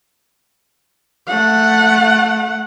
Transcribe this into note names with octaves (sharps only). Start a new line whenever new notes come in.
A3 F#5